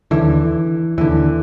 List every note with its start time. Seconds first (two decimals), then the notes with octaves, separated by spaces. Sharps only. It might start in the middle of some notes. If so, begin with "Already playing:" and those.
0.11 D#2 D3 E3
0.97 D#2 D3 E3